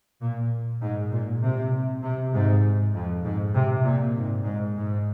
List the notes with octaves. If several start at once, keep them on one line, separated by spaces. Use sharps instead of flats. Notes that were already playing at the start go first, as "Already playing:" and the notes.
A#2
G#2
A#2
C3
C3
G#2
F2
G#2
C3
A#2
G#2
G#2
G#2